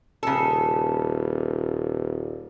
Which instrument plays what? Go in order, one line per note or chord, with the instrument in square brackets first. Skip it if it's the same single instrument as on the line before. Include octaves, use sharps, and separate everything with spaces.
[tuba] D#1 [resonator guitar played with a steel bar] C#3 A4